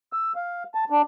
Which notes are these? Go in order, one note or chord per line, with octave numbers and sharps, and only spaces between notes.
E6
F5
A5
D4